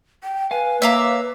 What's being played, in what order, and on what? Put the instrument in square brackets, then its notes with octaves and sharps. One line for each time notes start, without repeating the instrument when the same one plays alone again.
[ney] G5
[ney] B4 [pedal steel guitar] F5 G#5
[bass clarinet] A#3 [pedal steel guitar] C#5 D6 [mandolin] E5 F5 A#5